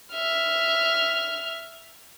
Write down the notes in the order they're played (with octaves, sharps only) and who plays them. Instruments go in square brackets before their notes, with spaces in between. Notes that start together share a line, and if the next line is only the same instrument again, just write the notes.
[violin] E5 F6